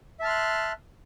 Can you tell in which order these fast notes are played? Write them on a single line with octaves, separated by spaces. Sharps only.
E5 A5 F6 C6 F#6